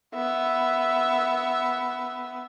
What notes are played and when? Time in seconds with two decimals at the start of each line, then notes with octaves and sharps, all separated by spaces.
0.14 B3 E5